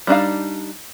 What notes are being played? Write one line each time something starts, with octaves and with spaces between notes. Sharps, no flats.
G3 D4 D#4 F5